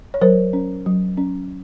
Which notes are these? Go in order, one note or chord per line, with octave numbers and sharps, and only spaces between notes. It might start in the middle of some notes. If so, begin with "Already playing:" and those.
C#5
F#3 A#4 C5
C#4
F#3
C#4